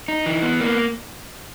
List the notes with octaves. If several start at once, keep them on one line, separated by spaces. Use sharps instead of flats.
D#4
E3
B3
A#3